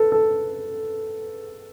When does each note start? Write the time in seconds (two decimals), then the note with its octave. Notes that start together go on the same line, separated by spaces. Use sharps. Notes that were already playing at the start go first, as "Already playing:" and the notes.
Already playing: A4 B4
0.12 A4